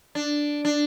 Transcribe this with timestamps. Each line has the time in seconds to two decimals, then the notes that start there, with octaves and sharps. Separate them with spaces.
0.15 D4
0.65 D4